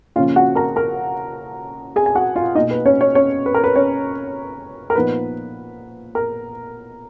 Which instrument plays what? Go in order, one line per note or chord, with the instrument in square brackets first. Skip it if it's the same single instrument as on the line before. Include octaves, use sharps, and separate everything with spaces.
[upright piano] C#3 F3 A#3 C#4 F4 F5
F#4 F#5
A#4 A#5
A#4 A#5
G#4 G#5
G#5
F#4 F#5
F4 F5
B2 A#3 D#4 D#5
B4
C#4 C#5
C#4 C#5
C#4 C#5
B4
A#4
B4
C#4 C#5
A#4
A#2 F3 B3 D#4 B4
A#4